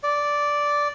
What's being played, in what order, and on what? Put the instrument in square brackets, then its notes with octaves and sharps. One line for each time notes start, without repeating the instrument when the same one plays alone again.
[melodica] D5